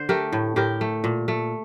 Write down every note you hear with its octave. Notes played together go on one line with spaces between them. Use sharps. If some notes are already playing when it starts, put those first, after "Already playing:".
Already playing: D3 C5 D5
A3 G4 A#4
A2
A2 G4 A#4
A3
A#2
A3